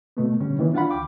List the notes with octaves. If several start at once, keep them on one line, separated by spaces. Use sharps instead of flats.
B2 A3 B3
A#2 D3 G3 C#4
D#3 E3 A#3 B3
D4 F4 F5 F#5 B5
D2 G5 D6